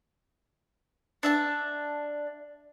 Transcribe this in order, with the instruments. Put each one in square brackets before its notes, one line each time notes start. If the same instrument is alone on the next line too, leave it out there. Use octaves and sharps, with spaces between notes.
[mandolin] D4 E5 A5